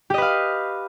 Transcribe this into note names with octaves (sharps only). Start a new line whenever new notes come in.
G4 B4 D#5 F5